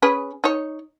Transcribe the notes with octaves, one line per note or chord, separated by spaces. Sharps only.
C#4 G#4 B4
D#4 C#5